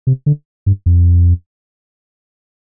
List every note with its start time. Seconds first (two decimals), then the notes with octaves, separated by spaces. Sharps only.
0.07 C3
0.26 D3
0.66 G2
0.86 F2